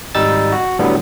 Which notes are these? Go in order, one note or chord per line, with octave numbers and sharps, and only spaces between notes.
G#1 G3 D#4 E6 A6
F#4
A2 D3 F#3 G3 B3